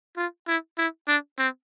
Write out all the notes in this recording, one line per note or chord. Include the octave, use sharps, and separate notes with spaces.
F4
E4
E4
D4
C4